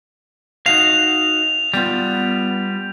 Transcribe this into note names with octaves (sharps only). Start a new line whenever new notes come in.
D#4 F#4 F5 F7
G3 B3 F4